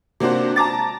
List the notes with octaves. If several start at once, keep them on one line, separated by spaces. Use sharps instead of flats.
C3 A#3 D4 F#4 C5
A5 A#5 D6 A6